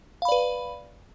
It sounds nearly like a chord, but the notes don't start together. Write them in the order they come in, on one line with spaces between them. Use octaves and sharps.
F5 B5 D5 B4